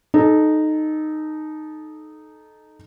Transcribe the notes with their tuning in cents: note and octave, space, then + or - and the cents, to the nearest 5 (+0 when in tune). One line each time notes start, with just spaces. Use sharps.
D#4 -10 A4 -25